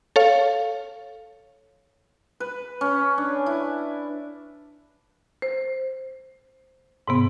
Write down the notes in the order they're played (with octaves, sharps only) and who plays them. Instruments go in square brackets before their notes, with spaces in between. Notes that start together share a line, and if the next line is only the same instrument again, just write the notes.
[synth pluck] A4 C#5 F5
[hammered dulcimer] B4
C#4
D4
E4
[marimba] C5
G#2 C3 B3